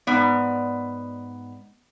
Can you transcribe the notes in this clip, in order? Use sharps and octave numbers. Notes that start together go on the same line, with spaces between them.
G#2 B3 D5